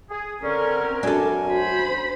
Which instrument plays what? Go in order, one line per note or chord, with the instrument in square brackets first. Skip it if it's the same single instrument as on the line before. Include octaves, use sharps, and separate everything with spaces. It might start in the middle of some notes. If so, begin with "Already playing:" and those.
[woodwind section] G#4
[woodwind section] D3 C#4 [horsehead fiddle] C4 A#4
[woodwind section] F#2 G#5 [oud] D4 A4 [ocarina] F#4
[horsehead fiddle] C5 B5